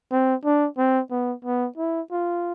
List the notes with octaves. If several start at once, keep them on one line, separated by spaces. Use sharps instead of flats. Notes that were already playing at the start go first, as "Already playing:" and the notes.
C4
D4
C4
B3
B3
E4
F4